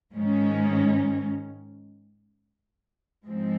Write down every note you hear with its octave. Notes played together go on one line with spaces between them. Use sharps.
G#2 D#3 G#3 C#4
G#2 F3 G#3 C4